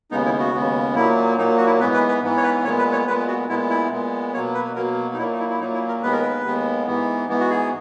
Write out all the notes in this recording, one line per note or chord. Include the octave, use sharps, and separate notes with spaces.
D#2 C#3 G#3 B3 D#4
E4
F#4
D#2 C#3 G#3 B3
A#2 F#3 A#3 E4
A#2 F#3 A#3 D#4
F#4
E4
G#2 E3 B3 B4
B4
B4
G#2 E3 B3
C#5
B4
A#2 G#3 B3 C#5
B4
C#5
A#2 G#3 B3 B4
F#4
A#2 G#3 B3 E4
E4
A#2 G#3 B3
B2 F#3 A#3 C#5
B4
B2 F#3 A#3 A#4
D#4
A#2 F#3 A#3 E4
D#4
E4
E4
A#2 F#3 A#3 D#4
E4
A#4
D#2 D#3 G#3 B3 B4
A#4
B4
D#2 D#3 G#3 B3
G#2 E3 B3
G#2 E3 B3
F#4
G#4